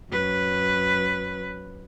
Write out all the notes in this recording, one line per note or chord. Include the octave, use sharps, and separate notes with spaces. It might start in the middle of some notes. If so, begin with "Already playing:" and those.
F#2 B4